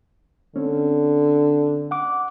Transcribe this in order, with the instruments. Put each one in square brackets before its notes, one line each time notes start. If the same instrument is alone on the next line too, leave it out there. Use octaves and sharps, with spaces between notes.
[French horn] D3 [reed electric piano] C4 C#4
[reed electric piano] F#5 D6